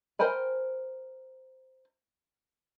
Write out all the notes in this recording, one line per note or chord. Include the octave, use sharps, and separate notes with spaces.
A#4 C5 G5 G#5 B5